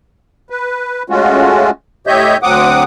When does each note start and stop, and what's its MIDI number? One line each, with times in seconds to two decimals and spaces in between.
0.50 1.03 71
1.10 1.70 56
1.10 1.70 57
1.10 1.70 61
1.10 1.70 65
1.10 1.70 66
2.07 2.38 45
2.07 2.38 67
2.07 2.38 73
2.07 2.38 75
2.07 2.38 76
2.07 2.38 91
2.43 2.84 38
2.43 2.84 54
2.43 2.84 60
2.43 2.84 78
2.43 2.84 86
2.43 2.84 87